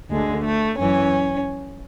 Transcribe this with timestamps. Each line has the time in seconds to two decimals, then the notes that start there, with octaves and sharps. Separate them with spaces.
0.11 D2 D3 G#3
0.44 A3
0.78 F#2 E3 C#4